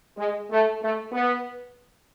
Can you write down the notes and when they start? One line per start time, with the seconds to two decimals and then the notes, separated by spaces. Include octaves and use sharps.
0.17 G#3
0.50 A3
0.82 A3
1.12 B3